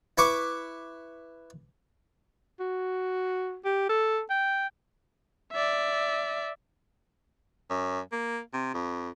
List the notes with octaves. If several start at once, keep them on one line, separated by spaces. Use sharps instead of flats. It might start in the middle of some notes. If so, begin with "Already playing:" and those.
E4 B4 C#6 D6
F#4
G4
A4
G5
D5 E5
F#2
A#3
C3
F2